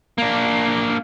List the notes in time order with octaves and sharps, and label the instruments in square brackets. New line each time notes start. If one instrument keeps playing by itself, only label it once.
[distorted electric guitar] A#3 D4